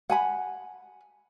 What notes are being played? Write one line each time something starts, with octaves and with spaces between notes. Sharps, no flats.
F#5 G#5 B5